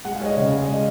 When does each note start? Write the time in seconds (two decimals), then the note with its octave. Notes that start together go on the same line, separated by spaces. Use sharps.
0.05 G#3 F#5
0.15 F5
0.20 G#3 C#5
0.26 D#5
0.36 C#3 D#5
0.52 G#3
0.67 G#3 D#5